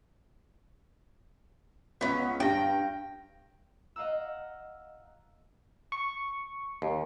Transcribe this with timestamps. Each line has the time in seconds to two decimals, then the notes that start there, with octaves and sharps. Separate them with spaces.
2.01 C#2 B3 C#4
2.40 G2 G5 A#6
3.96 D#5 F5 F#5 A#5 E6
5.92 C#6
6.82 D#2